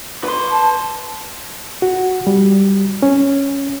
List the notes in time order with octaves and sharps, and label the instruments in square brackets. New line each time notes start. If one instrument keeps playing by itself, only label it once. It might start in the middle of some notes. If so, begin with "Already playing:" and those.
[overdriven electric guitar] B4 C6
[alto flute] A5
[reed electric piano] F#4
G3
C#4